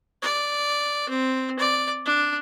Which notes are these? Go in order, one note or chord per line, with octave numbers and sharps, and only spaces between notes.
D5
C4
D5
D4